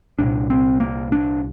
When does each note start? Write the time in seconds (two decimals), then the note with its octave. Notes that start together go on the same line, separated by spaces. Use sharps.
0.19 C2 A#2 D4
0.50 C4
0.80 A#3
1.12 D4